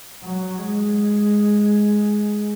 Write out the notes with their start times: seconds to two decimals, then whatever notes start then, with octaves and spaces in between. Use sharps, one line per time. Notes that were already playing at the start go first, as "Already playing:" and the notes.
0.23 F#3
0.58 G#3